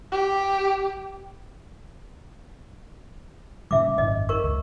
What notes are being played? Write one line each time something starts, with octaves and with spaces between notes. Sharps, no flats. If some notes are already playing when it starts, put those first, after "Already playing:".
G4
A#2 C#3 G3 E5 D6
G#1 F#2 D#5
A#4 C#6
C#2